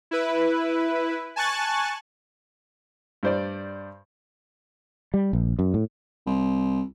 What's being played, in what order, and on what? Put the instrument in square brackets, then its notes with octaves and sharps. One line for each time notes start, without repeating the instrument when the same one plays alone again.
[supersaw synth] E4 B4
G#5 A5 C#6 F#6 A6
[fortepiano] G2 C5 D5
[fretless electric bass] G3
A#1
F#2
A2
[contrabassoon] C2